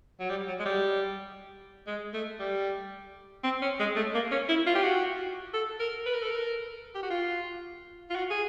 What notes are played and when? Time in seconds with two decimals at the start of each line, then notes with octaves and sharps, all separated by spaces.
0.20 F#3
0.30 G3
0.48 F#3
0.59 G#3
0.65 G3
1.87 G#3
2.14 A3
2.40 G3
3.44 C4
3.62 C#4
3.80 G#3
3.96 A3
4.15 A#3
4.32 C#4
4.49 E4
4.66 F4
4.75 G4
4.83 F#4
5.54 A4
5.80 A#4
6.06 B4
6.14 A#4
6.22 A4
6.30 A#4
6.95 G4
7.03 F#4
7.10 F4
8.10 F4
8.15 F#4
8.30 G#4